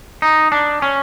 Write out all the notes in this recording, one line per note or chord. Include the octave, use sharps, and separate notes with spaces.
D#4
D4
C#4